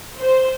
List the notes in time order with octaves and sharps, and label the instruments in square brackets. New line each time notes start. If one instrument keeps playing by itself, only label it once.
[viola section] C5